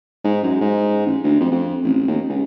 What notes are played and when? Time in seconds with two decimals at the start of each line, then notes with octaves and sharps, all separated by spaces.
0.24 G#2
0.43 F#2
0.61 G#2
1.06 A1
1.24 D2
1.40 F2
1.52 F2
1.84 A1
2.08 D#2
2.29 C#2